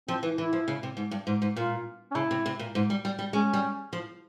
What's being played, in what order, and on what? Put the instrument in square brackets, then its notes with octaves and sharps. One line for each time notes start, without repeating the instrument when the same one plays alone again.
[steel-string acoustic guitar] F3 [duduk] C4
[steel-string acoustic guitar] E3
[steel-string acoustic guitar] E3 [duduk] E4
[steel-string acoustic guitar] F3
C#3
C3
G#2
G2
G#2
G#2
[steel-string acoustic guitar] A#2 [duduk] F4
[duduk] C#4
[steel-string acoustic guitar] C#3 [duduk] E4
[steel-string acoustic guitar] C3
C3
A#2
G#2
G3
G3
G3
[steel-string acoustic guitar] G#3 [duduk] C#4
[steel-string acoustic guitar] G3
F3